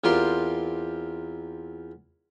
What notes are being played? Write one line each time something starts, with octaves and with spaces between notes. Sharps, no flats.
E2 C4 F4 G4 A#4 C6